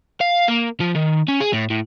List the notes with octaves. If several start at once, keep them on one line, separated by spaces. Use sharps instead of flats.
F5
A#3
F3
D#3
C#4
G#4
A2
A2